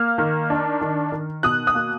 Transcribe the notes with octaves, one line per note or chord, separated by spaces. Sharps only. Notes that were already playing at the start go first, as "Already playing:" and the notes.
Already playing: A#3 F6
D#3
D4
D#3
D#3
B2 D#6 F#6
D#6 F#6
A#3